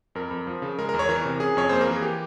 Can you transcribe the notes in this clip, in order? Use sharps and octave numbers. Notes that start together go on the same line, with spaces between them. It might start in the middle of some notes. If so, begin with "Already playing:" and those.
F2 A#4
F2
F3
C#3
G#3 A#4
A#4
E2
C#5
E3 A#4
C3
C#4 G#4
F2 C#5
A#3 C5
A#4
E3 G#4
G4